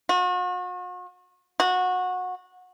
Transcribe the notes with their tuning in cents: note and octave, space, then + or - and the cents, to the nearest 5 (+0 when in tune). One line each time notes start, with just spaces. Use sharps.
F#4 -40
F#4 -20